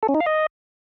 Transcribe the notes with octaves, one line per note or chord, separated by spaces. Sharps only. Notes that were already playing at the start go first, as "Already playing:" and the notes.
A4
C#4
D#4
F5
D#5